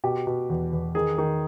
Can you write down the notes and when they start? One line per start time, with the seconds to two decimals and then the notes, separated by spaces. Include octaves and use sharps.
0.04 B2 G4
0.27 B2
0.49 E2
0.73 E2
0.95 D#3 G#4
1.18 D#3